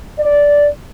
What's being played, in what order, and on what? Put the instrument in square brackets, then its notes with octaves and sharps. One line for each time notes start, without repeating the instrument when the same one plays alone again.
[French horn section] D5